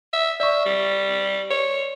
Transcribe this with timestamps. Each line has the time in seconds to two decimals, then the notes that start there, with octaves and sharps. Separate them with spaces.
0.13 E5
0.40 D5 E5 C#6
0.65 G3
1.50 C#5